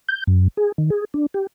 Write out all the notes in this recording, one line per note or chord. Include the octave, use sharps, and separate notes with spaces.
G6
F#2
G#4
D#3
G#4
D4
G4